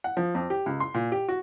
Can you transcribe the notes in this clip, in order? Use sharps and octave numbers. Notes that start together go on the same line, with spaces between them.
F#5
F3
F2
G4
C#2
C6
A#2
G4
F#4